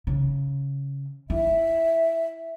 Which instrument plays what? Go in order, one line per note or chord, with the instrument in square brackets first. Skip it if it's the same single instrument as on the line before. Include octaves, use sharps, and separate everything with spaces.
[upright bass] C#3
[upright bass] E4 [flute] E5